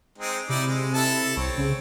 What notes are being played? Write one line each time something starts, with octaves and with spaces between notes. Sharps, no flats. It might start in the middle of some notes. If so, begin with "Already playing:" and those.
G#3 C4 D#4
C3 D#4 E4 D5
G#3
E4 A4 A5
C2 C4 C#5
C#3